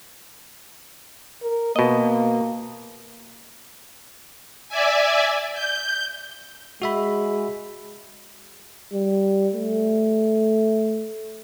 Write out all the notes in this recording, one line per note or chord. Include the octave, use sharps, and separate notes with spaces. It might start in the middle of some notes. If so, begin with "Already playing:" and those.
A#4
B2 A#3 D#5
D5 E5 G#5
G6
G#3 F#4 E5 B5
G3
A3